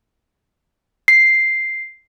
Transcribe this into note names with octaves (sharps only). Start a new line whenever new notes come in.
C7